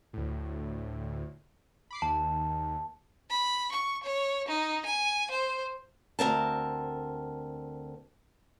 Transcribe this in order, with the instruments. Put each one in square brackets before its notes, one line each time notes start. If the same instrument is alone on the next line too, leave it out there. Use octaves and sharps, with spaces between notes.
[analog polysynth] D2 A2
B5 D6 C7
[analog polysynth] D#2 [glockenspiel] A5
[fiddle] B5
C#6
C#5
D#4
G#5
C5
[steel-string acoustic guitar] D2 C4 A#4 A5